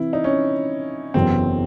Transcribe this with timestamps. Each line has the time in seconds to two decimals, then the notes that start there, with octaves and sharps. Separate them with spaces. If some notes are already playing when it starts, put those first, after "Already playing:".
Already playing: C3 E3 C4 E4
0.13 D#4
0.24 C#4
1.14 F#1 E2 C3 F#3 C4